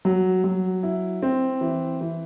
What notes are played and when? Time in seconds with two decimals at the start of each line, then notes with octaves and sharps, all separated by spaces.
0.05 F#3
0.44 F#3
0.83 E4
1.22 C4
1.61 E3
2.01 E3